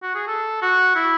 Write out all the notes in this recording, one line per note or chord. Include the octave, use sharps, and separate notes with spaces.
F#4
G#4
A4
F#4
E4